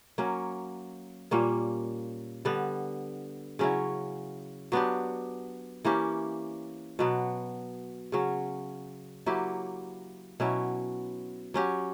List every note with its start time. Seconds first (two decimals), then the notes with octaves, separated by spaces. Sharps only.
0.18 F#3 A#3 C#4
1.31 A#2 G3 A#3 C#4
2.45 D3 G3 B3
3.59 C#3 F#3 C#4 E4
4.72 F#3 B3 D4 G4
5.85 E3 A#3 C#4 G4
6.99 B2 F#3 B3
8.12 C#3 F#3 C#4
9.26 F#3 A#3 E4 G4
10.40 B2 F#3 C#4 E4
11.54 F#3 C#4 G4